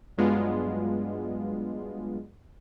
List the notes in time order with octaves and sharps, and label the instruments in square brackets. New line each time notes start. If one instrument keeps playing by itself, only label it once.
[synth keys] G2 F#3 G#3 B3 D4 F4